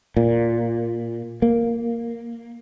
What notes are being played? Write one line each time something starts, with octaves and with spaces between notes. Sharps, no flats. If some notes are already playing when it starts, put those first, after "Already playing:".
A#2
A#3